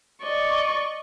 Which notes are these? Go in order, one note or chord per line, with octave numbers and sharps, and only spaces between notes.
D5 D#5 C#6